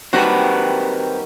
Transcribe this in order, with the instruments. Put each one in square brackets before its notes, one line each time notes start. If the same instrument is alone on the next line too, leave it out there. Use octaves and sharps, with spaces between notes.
[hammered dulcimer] D#3 F#3 G3 [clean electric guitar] C4 G4 B4 [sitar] F#4